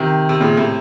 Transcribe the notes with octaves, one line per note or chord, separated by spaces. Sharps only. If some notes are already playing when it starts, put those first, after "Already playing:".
Already playing: C3 D#3
C3
A#2 C#3
A2 C3